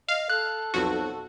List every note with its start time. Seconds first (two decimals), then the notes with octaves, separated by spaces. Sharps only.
0.09 D#5 F5
0.30 A4 F#6
0.74 B1 F2 F#4